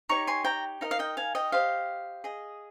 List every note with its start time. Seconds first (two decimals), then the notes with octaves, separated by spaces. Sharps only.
0.09 D#4 G4 C#5 A#5 C#6
0.27 G#5 C6
0.44 G5 A#5
0.81 D#4 A#4 D#5 F5
0.91 F5
0.99 D#5 G5
1.17 F5 G#5
1.35 D#5 G5
1.52 G4 C5 D#5 F5
2.24 G#4 D#5